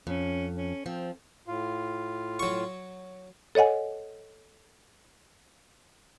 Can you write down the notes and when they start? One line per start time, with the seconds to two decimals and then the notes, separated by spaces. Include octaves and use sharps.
0.07 F2 C#4
0.57 C#4
0.86 F3 C4
1.48 A2 F4 F5
2.39 F#3 C#6
3.55 A4 C#5 D#5 F#5 G#5